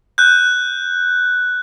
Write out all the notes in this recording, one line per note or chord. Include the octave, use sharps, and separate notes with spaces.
F#6 G6